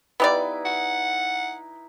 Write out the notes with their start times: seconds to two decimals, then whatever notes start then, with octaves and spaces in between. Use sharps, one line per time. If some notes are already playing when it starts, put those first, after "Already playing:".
0.20 B3 D#4 E4 G4 B4 D5
0.65 F#5